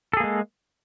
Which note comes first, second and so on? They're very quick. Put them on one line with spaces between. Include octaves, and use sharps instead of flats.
A4 G#4 A#3 G#3